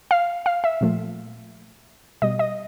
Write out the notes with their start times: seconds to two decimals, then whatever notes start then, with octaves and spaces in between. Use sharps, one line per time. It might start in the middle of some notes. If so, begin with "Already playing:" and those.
0.11 F5
0.46 F5
0.64 E5
0.81 A#2 F3 A3
2.22 B2 G3 D#5
2.39 D#5